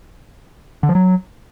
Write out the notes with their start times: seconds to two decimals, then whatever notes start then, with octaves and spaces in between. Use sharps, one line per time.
0.83 D3
0.89 F3
0.95 F#3